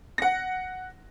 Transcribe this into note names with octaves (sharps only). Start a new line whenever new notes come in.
F#5 A#6